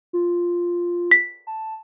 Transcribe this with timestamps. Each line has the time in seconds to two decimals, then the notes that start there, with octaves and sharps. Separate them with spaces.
0.13 F4
1.11 B6
1.47 A5